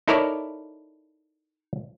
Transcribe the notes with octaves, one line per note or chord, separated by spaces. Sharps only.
D#4 E4 A4 A#4 C#5 D5